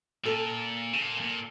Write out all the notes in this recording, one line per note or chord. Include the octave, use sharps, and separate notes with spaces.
A#2 A4
C#3
A#2
A#2